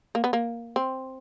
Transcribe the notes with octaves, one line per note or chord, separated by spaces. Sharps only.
A#3
B3
A#3
C4